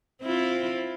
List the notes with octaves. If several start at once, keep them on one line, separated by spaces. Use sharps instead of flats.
C4 E4 F4